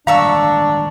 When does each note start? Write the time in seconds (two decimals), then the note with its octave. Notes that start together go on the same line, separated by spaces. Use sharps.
0.07 D#3 G3 G#3 D4 F5 A#5 C#6 E6